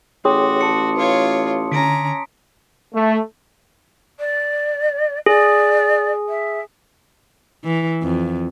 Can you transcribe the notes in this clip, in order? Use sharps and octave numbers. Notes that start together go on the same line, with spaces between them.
A1 F#4 G#4 C#5 G5 C6 D6 D#6
A5 C#7
F4 B4 C#5
D3 C#4 A#5 B6 D7
A3
D5
G#4 D5
E5
E3
F2